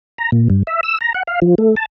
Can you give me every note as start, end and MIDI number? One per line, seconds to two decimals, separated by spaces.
0.18 0.30 82
0.32 0.48 46
0.50 0.63 43
0.67 0.81 76
0.83 0.98 88
1.01 1.13 82
1.14 1.23 78
1.27 1.40 77
1.42 1.55 53
1.58 1.75 57
1.76 1.86 81